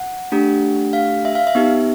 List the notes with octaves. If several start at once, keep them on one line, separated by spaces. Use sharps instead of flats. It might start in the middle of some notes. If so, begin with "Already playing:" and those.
Already playing: F#5
A3 D4 G4
F5
E5
F5
E5
B3 D#4 G4